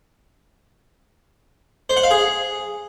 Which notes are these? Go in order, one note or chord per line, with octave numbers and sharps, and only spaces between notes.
C5
F#5
F5
G#4